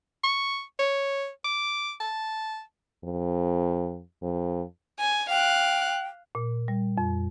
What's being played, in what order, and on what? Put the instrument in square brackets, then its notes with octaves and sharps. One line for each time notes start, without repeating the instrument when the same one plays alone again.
[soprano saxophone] C#6
C#5
D6
A5
[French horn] F2
F2
[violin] G#5
[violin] F5 F#6 [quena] G5
[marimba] A#2
G3
F2